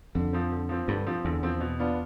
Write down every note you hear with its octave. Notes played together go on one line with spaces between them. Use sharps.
F2 D3
F3 C4
D3
F3 C4
G2 D3
F3 C4
E2 D3
F3 C4
B2
B3 D4 F4